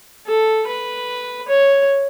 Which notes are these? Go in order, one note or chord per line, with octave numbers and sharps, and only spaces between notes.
A4
B4
C#5